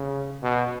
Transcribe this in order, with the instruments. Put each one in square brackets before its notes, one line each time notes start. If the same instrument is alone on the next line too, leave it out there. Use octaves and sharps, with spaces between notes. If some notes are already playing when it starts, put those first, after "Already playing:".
Already playing: [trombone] C#3
B2